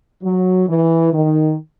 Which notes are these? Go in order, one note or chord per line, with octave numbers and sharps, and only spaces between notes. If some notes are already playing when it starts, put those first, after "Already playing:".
F#3
E3
D#3